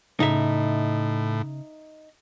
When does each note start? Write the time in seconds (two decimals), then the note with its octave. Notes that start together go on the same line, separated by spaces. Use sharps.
0.20 A2 C#3 D#4 E5